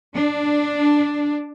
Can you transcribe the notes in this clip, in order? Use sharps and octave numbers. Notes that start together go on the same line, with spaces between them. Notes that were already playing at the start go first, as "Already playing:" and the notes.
D4